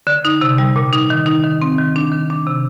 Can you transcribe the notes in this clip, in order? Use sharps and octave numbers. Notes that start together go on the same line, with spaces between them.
D3
D#4
C3
G3
A#2
D#4
D#3
D#4
D#3
C4
D#3
D4
D#3
D4
C3